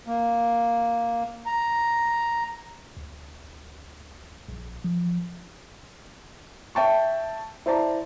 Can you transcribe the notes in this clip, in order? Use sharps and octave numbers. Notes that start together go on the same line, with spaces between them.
A#3
A#5
D2
A#1
F3
E5 G5 A5 C#6
E4 C5 D5 A5 A#5